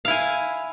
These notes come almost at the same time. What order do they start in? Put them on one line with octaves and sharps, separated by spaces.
F5 E4 G#5